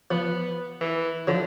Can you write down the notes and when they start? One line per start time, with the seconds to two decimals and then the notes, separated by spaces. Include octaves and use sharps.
0.11 F3 B3
0.81 E3
1.27 D3 F3 F#3